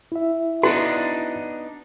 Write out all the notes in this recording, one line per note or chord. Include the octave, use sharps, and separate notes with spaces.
E4 E5
B3 D4 D#4 F#4